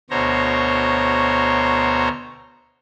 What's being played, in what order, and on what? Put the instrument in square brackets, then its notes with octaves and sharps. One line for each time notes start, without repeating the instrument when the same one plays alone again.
[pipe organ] D2 B2 C5 C#5 A#5